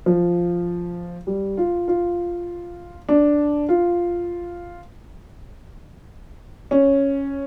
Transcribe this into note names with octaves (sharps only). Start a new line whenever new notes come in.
F3
G3
F4
F4
D4
F4
C#4